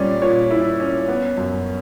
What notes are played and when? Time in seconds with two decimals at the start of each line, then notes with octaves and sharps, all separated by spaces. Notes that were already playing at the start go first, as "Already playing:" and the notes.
Already playing: A#2 G3 C#4 C#5 D5
0.22 A#2 C#5
0.51 E4
0.80 C#4
1.08 B3
1.37 F#2